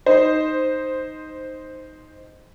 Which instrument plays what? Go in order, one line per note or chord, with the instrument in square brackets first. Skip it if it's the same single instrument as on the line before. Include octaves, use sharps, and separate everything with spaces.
[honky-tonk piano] D#4 C5